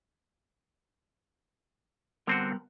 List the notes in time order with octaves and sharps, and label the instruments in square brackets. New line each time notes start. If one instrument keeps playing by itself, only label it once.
[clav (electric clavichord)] D3 C4 F#4 [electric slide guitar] G3 B3 A#4